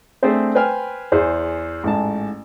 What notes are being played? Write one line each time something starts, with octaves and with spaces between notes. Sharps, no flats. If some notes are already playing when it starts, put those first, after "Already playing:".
A3 C4 D4 G#4 C5
B4 C5 G5 G#5 F6
E2 G#4 C5
A1 G#2 A5